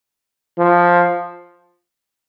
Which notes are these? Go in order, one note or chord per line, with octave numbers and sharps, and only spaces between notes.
F3